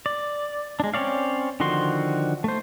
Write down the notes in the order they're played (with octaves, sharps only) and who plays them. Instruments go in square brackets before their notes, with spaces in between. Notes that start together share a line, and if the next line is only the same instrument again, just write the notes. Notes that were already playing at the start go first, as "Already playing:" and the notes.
[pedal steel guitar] D5
G#3 D4
C4 C#4 C#5 D5 F5
D3 D#3 F3 F#4 C6
A3 C5